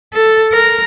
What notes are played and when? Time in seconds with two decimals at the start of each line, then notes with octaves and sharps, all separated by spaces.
0.13 A4
0.52 A#4